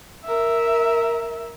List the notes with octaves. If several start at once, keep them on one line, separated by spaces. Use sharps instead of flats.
A#4 E5